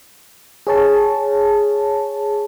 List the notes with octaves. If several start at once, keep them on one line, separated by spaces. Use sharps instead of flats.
G#4 C#5 A5